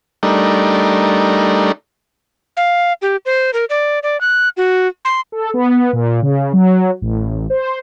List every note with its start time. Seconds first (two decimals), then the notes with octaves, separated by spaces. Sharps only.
0.23 G3 A3 D4 D#4 A#4
2.57 F5
3.02 G4
3.26 C5
3.53 A#4
3.70 D5
4.03 D5
4.21 F#6
4.57 F#4
5.05 C6
5.32 A4
5.54 B3
5.93 A#2
6.22 C#3
6.53 F#3
7.02 A1
7.50 C5